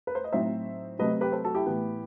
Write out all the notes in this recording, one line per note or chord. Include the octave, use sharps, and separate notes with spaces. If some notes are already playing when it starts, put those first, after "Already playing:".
B4
C5
D#5
A2 F#3 C4 D#4 C5 E5
C3 F#3 A3 C4 B4 D#5
G4 B4
A4 C5
F#4 A4
E4 G4
A2 E3 B3